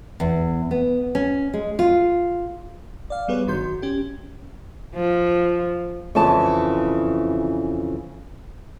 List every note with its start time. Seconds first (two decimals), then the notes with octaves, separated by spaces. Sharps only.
0.20 E2
0.71 B3
1.15 C#4
1.53 G#3
1.79 F4
3.10 D5 F5
3.28 G3 B3 G#4 B4 C#5
3.46 G1 F#2 D#3 F#4 C6 G6
3.82 C#4 G4
4.94 F3
6.15 F2 C#3 E3 A5